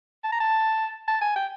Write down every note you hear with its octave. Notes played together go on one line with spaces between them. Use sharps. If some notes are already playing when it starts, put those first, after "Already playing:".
A5
A#5
A5
A5
G#5
G5